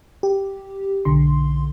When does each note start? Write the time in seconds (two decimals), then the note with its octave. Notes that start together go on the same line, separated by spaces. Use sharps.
0.23 G4
1.05 B1 D3 C6